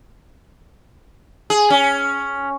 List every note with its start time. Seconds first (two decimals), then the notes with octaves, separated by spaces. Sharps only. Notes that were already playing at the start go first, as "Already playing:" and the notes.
1.50 G#4
1.70 C#4